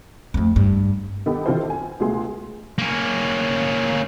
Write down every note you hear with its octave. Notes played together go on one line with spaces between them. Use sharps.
F2 A3
G2
D#3 B3 D#4 G4 A4
D#3 E3 C4 F4 A4 C5
G#5
C#2 B2 A3 G#4 C6
A#3 C#4